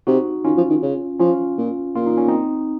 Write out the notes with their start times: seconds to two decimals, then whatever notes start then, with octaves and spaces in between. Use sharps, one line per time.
0.07 C3 D#4 F#4
0.44 D#3 C#4 F4
0.57 F3
0.70 D#3
0.82 C#3
1.19 F3 C#4 F4
1.58 A#2
1.95 A#2 F4
2.06 D#4
2.18 C#4
2.28 C4 D#4